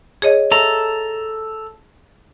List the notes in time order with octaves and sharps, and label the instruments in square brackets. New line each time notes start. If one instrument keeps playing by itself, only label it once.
[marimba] G#4 C#5 D#5
[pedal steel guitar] A4 A#5 [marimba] E5